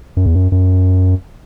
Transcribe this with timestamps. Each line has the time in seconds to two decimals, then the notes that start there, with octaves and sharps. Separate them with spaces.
0.17 F#2
0.26 E2
0.36 F#2
0.52 F#2